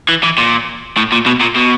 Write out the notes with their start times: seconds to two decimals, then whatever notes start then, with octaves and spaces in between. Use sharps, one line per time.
0.09 E3
0.23 E3
0.38 A#2
0.97 A2
1.12 A#2
1.26 B2
1.41 A#2
1.56 B2